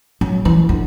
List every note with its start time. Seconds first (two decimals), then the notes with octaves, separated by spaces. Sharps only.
0.21 F#3
0.45 E3
0.69 D3